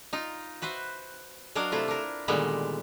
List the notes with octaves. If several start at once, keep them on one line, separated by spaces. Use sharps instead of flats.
D#4 F4
F#4 B4 C5 E5
F#3 D4 A#4 D#5 F5
C3 A3 E4 F4
D4 A#4
A#2 D3 D#3 G3 G#3 B3